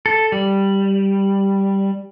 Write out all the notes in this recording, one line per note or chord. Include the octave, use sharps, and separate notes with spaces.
A4
G3